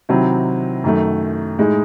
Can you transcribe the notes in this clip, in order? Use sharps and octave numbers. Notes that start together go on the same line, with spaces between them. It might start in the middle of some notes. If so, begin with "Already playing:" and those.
C3 D#3 F#3 C4 E4
F#2 D#3 F#3 A3
A2 G#3 D#4 G#4